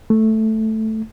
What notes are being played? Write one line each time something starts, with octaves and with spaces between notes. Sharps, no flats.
A3